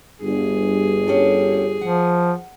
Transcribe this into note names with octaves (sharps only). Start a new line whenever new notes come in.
G1 G2 G#4
C#4 G4 A4
F3 F#5